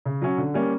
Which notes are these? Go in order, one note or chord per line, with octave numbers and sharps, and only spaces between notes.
C#3
F#3 C#4
D3
G3 A#3 C#4